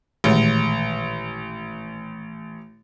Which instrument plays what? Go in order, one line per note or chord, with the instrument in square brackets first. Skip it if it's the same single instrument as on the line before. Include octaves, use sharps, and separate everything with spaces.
[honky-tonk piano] A1 [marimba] A#2 D#3 G#3